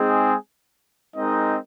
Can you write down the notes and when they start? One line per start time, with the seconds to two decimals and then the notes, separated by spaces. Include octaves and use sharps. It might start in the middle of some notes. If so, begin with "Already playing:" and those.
Already playing: G#3 C4 D#4 G#4
1.15 G#3 C4 D#4 A#4 D#5